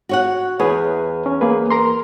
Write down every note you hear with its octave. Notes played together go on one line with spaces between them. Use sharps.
F#4 C#5 F#5
E2 G#4 B4 C#5
C#4
A#3 G#4 B4
A#4 A#5 C6